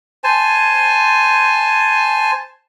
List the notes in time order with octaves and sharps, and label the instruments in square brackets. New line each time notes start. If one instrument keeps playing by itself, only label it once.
[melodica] C5 G#5 A5